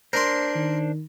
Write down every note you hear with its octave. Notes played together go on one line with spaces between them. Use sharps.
D4 A#4 C5 C6
D#3